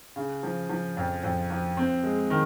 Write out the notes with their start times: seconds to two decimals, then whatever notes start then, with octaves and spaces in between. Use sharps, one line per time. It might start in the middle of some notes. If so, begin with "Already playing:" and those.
0.16 C#3
0.43 F3
0.69 F3
0.97 F2
1.23 F2
1.50 F3
1.77 C4
2.03 G#3
2.30 D#3